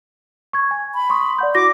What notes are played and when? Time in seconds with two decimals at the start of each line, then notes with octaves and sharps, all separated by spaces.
0.53 C#6 G#6
0.71 G#5
0.95 B5
1.10 C6 C#6 D#6
1.39 D5 F#5 G6
1.55 E4 F#4 D6 A#6